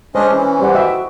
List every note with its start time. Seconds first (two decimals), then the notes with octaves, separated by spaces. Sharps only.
0.15 G#3 C#4 D4 C5 D#5
0.31 E3 C#4
0.60 G3 C5 D5 F#5
0.75 F#4 D#5 E5 G5
0.91 E4